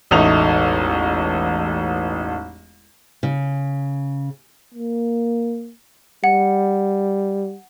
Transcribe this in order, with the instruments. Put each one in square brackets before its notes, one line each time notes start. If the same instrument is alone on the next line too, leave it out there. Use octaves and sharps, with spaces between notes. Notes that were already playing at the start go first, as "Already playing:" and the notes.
[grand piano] E1 A1 A3 D#4 F7
[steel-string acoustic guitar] C#3
[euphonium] A#3
[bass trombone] G3 [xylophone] F#5